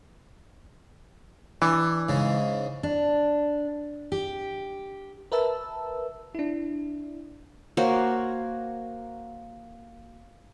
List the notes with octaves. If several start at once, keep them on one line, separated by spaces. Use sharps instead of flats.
E3 D4
G#2 C#3
D4
G4
A#4 B4 E5 A5 E6
D4 E4
A#3 F#4 C5 C#5